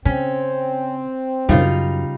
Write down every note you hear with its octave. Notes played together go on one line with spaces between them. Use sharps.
C#3 C4 C#4
F#2 C#3 G3 C#4 D#4 F4